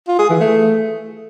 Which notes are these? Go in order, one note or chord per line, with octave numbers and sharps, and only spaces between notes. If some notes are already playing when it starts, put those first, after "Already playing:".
F4
G#4
E3
A3